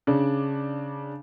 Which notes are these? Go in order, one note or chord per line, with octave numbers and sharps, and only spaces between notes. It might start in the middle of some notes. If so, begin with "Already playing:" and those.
C#3 D4